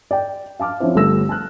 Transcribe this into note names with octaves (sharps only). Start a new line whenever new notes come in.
D5 G5
F5 A5 D6 F6
F3 C4 C#4 E4 C5
G1 G3 A3 E6 A#6
A5 F6 F#6